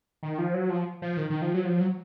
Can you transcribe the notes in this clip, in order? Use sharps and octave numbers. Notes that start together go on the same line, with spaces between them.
D#3
F3
F#3
F3
F3
D#3
D#3
F3
F#3
F3
F#3